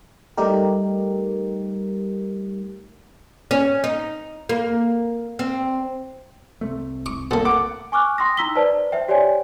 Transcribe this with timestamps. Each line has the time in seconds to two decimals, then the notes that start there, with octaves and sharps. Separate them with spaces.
0.37 G3 A3 D#4 G4 A#4
3.51 C#4
3.84 D#4
4.49 A#3
5.39 C4
6.61 C2 C3 A3
7.06 C#6 D6
7.31 A#2 A#3 A4
7.45 F#5 D6
7.92 G#5 C#6 D6 F6 F#6
8.18 G5 C6 D#6 A#6
8.37 D#4 A#5 E6 B6 G7
8.55 B4 C5 D5 A5
8.92 C5 E5 G5
9.08 G4 C#5 D5 G5 G#5